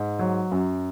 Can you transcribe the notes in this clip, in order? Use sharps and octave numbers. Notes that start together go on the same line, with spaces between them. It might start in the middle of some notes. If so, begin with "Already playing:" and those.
Already playing: G#2
F#3
F#2